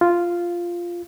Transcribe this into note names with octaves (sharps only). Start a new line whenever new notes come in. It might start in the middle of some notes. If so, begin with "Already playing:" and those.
F4